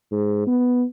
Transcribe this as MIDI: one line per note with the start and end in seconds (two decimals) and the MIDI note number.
0.12 0.42 44
0.47 0.84 59